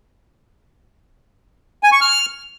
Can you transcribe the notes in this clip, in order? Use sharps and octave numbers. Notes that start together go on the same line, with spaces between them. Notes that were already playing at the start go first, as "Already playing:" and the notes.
G#5
C#6
F6